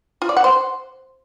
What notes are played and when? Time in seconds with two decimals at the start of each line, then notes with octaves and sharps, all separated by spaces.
0.22 F4
0.29 D5
0.37 F#5
0.44 C5